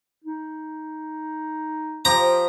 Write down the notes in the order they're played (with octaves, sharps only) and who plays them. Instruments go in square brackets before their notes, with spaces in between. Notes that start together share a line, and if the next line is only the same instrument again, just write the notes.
[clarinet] D#4
[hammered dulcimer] F3 G4 C5 [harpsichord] A#5